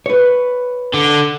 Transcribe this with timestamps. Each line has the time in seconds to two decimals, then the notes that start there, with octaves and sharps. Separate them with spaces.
0.06 B4 C#5
0.94 D3